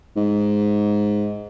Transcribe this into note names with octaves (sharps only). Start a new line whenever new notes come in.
G#2